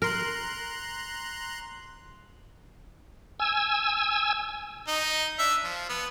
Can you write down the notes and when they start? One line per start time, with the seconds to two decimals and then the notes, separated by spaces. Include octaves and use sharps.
0.02 A#4 A#5 C6 F#6
3.40 G#5 E6
4.87 D#4
5.39 D4 E5
5.64 F3
5.89 B3